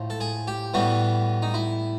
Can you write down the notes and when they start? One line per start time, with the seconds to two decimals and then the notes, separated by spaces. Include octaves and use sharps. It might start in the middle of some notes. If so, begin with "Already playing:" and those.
Already playing: A2 F3
0.10 A4
0.20 G#4
0.47 G4
0.74 A2 E3 G3 B3 F#4
1.42 D#4
1.54 E4